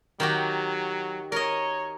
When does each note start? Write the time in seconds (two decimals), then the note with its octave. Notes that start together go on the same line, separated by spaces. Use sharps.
0.20 D#3 F#3 F#4 G4
1.32 A#4 C#5 D#5